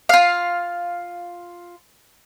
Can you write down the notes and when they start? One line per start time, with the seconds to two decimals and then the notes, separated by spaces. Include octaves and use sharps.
0.09 F4 F5